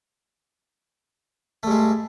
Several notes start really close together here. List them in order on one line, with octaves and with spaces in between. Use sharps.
A3 G2 G#3